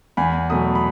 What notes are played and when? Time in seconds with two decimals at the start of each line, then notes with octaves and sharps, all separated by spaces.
0.17 E2 G#5 B5
0.50 B2 F#3 A3 B5 D#6
0.75 B5